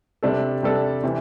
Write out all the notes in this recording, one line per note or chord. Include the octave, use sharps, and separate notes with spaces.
C3 G3 D4 A4
C3 G3 D4 A4
C3 E3